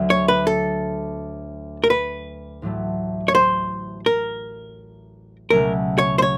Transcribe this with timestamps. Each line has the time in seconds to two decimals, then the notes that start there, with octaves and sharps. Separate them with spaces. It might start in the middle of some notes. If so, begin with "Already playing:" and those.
Already playing: D2 D3 F#3
0.10 C#5
0.28 B4
0.47 A4
1.84 A#4
1.90 B4
2.62 A1 A2 F#3 A3
3.28 C#5
3.35 C5
4.06 A#4
5.50 C#2 B2 F#3 A3 C#4 A#4
5.98 C#5
6.18 C5
6.22 C#5